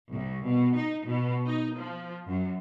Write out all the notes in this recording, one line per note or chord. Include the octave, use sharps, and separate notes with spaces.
C2
B2
D#4
B2
D#4
F3
F#2